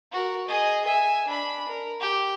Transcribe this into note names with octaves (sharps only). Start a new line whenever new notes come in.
F#4 A#4
G#4 D#5
E5 G#5
D4 B5
A#4
G4